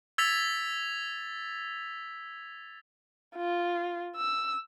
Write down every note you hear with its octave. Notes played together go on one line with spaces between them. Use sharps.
E6 G#6 A6 B6 F7
F4
E6